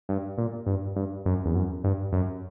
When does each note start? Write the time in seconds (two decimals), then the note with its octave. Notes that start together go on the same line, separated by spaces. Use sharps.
0.09 G2
0.38 A#2
0.66 G2
0.96 G2
1.26 F#2
1.45 E2
1.55 F#2
1.84 G2
2.12 F#2